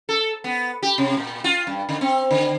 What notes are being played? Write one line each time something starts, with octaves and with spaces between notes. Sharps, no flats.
A4
B3
G4
C3
A#2
F4
G2
D3
C4
D3